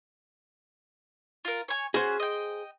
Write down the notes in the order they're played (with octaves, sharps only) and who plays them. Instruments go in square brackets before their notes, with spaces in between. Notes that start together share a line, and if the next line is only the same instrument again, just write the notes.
[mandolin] F4 A#4
C#5 G#5
[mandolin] C#4 F#4 [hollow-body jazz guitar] G#4 C5
[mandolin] D#5 G5